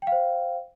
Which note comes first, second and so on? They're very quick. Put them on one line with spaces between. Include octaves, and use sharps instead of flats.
G5 F5 C5